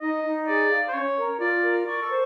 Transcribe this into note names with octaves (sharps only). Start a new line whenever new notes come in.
D#4 D#5
D#4
G#4 D5
F5
C5
C#4 C#5
A#4
F4 D5
A#4
D5 C#6
A4
C5